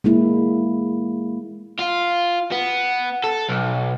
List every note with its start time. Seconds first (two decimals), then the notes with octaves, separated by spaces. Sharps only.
0.04 G#3 A#3 E4
1.79 F4
2.52 B3
3.24 A4
3.49 B1